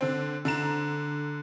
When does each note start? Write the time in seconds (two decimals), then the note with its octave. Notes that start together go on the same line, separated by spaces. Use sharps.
0.01 D3 C4
0.45 D3 A#5 E7